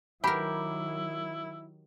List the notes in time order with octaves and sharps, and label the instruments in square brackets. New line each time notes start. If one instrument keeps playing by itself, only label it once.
[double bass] D#3 F#3 [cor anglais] E4 [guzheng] G4 A#4 [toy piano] F#5 B5